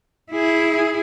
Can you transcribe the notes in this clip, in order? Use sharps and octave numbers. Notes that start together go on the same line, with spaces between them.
E4 G#4